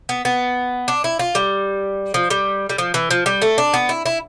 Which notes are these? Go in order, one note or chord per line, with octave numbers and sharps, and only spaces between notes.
B3
B3
D4
E4
F4
G3
F3
G3
G3
F3
E3
F3
G3
A3
D4
B3
E4
E4